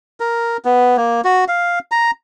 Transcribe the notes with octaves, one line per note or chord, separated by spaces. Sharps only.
A#4
B3
A#3
F#4
F5
A#5